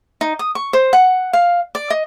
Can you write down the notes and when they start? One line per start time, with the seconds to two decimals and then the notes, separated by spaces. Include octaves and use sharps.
0.21 D#4
0.39 D#6
0.55 C#6
0.73 C5
0.93 F#5
1.33 F5
1.75 D5
1.90 D#5